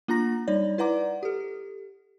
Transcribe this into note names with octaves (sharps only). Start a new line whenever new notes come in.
A#3 D4 F4 A#5 A#6
G3 D#4 C#5 D5
E4 B4 D5 F#5 A#5 D6
G4 A4